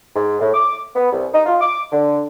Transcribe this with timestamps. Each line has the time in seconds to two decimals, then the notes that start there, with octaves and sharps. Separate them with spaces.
0.15 G#2
0.40 A2
0.54 D6
0.96 B3
1.12 C2
1.34 D#4
1.46 F4
1.61 D6
1.92 D3